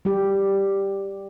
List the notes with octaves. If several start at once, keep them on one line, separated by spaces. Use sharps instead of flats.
G3 G4